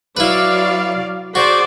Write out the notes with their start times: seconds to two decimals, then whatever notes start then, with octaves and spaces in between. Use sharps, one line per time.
0.17 F#3 E4 B4 D5 F5
1.35 F#4 G#4 C5 D5